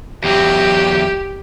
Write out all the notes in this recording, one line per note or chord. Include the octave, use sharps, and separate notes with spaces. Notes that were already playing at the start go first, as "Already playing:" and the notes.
E2 F#3 G4